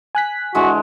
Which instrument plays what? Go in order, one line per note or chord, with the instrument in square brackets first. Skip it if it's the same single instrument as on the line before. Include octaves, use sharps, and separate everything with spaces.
[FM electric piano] G#5 F#6 B6
[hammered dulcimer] D3 E3 G#3 [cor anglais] F#4